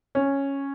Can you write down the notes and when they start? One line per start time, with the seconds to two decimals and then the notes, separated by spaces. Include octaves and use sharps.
0.15 C#4